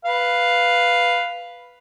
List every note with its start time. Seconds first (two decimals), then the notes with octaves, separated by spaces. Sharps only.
0.05 B4 F5